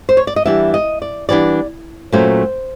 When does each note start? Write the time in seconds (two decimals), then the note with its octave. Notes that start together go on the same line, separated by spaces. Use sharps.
0.09 C5
0.17 C#5
0.27 D5
0.36 D#5
0.45 E3 G3 B3 D4 E5
0.74 D#5
1.02 D5
1.29 E3 G3 B3 D4 D5
2.12 A#2 F#3 A3 C#4 C5